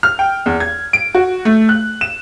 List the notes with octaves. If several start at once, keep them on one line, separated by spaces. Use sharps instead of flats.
F6
G5
E2
G#6
D7
F#4
A3
F#6
E7